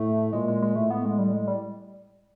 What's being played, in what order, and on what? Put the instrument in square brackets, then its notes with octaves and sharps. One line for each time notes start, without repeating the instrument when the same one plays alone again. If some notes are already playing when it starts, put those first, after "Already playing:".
Already playing: [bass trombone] A2 [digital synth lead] A3
[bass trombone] A#2 [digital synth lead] G#3
[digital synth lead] G#3
G#3
[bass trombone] A2 [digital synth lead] A3
[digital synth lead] B3
G#3
G3
G#3
G3